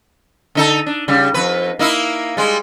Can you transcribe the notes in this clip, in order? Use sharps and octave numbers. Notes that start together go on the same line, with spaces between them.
D3 D#4 A4
D4
C#3 G3
F2 B4
A#3 D#4 E4
G3 G#3